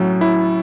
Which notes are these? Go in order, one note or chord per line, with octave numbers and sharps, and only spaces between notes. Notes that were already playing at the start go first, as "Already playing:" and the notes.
Already playing: A2 F#3 C#4
E4